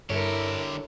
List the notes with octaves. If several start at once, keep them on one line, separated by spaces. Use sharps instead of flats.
G2 D3 E4 G4 A4 A#4 C#5